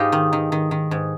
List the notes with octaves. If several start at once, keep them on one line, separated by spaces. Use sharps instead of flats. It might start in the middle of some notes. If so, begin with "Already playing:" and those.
Already playing: G#2 D#4 F4 G4
D#3
D#3
D#3
D#3
G#2